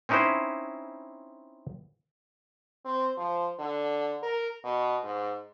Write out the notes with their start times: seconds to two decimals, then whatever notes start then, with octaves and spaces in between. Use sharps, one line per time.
0.09 C4 C#4 D#4 E4 B4 C5
2.85 C4
3.17 F3
3.59 D3
4.23 A#4
4.64 B2
5.04 G#2